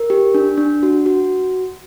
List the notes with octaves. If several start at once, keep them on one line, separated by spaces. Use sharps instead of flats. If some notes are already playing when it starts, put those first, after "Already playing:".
Already playing: A#4
G4
D4
D4
F#4
F#4